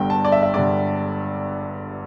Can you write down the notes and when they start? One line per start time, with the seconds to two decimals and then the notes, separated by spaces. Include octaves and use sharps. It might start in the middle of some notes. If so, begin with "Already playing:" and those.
Already playing: G1 G2 D3 G5
0.10 A5
0.25 D5
0.32 E5
0.43 E5
0.54 G1 G2 D3 D5